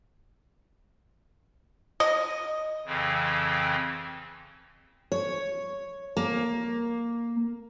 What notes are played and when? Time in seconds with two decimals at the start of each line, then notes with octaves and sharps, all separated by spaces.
2.00 D#5
2.86 F2 C#3 E3 C4
5.12 C#5
6.17 A#3